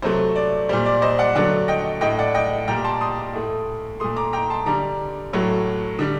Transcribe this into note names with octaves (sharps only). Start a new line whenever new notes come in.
C3 F#3 A3 C5
D5
A#2 G3 C5
D5
C5 D#5
D5 F#5
D3 F#3 A3 D5 F#5
D#5 G5
A2 A3 D#5 G5
D5 F#5
D#5 G5
A#2 G3 G5 A#5
A5 C6
C6 D#6
A2 A3
A#2 A3 C6 D#6
A#5 D6
G5 A#5
A5 C6
D3 G3 A#5 D6
A2 F#3 A3
D3 G3